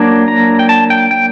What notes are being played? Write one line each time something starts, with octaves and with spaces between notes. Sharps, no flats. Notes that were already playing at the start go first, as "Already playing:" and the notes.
Already playing: F#3 A#3 D4
A#5
G5
A5
G5
G5